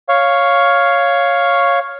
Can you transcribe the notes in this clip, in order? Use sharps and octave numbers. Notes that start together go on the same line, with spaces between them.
C#5 F5